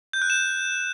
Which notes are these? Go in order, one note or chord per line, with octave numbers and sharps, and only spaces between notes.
G6
F#6
E7